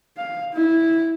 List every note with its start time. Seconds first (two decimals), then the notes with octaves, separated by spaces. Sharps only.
0.17 F5
0.53 E4